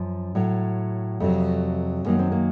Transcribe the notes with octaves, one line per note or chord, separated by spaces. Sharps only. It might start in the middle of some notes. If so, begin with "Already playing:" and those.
Already playing: F#2 F3
A2 F#3
F2 C3 F#3 A3
F#2 D#3 F#3 A#3
C4
A#3